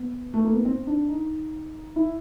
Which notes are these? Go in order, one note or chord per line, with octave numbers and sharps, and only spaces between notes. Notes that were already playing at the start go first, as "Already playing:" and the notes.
Already playing: B3
A3
A#3
B3
C4
D4
D#4
E4